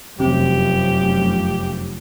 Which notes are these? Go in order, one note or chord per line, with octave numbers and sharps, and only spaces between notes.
F1 F#2 C3 F3 G4